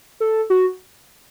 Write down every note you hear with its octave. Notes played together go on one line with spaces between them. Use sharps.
A4
F#4